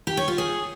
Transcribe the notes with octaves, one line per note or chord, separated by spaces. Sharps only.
G4
C#5
F4
G#4